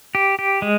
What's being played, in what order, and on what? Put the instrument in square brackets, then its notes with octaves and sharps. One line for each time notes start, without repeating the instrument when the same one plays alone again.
[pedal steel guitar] G4
G4
G#3